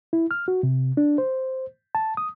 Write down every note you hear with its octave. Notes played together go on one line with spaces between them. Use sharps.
E4
F6
F#4
C3
D4
C5
A5
D#6